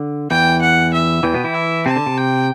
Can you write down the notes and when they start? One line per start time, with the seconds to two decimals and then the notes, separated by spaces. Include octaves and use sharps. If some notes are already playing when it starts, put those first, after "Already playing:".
Already playing: D3
0.30 E2 E3 G5
0.61 F#5
0.93 E5
1.23 E2 E3 G5
1.34 B2 B3
1.44 E3 E4
1.54 E5
1.86 C3 C4 A5
1.96 D3
2.06 C3
2.17 G5